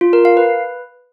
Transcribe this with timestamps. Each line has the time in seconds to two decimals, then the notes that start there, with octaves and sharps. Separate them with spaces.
0.01 F4
0.13 A#4
0.25 F5
0.37 B4